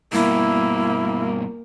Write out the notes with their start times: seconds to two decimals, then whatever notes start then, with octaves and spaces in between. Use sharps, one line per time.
0.13 G2 B2 A#3 E4